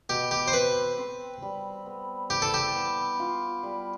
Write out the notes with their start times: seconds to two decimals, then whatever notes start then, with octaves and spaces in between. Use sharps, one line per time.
0.09 B2 G4
0.31 G4
0.48 C5
0.53 C4 B4
0.98 C4
1.42 G3
1.86 B3
2.30 E3 G4
2.42 A4
2.54 G4
2.75 B3
3.20 F4
3.63 G3